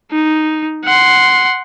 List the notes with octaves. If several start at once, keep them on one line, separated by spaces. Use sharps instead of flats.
D#4
F#5 C6